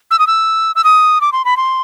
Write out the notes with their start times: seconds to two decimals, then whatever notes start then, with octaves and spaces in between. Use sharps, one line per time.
0.11 E6
0.19 D#6
0.27 E6
0.75 E6
0.84 D#6
1.21 D6
1.32 C6
1.45 B5
1.57 C6